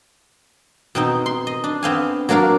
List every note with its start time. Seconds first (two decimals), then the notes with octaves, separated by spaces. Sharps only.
0.95 B2 C4 D#4
1.26 C6
1.47 D#5
1.64 D4
1.83 B3 C4 F5 G#5
2.29 F#3 A#3 D4 A#4 F5